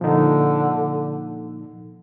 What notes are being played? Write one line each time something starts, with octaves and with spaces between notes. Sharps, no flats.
A#2 D3 F3 A#3 D#4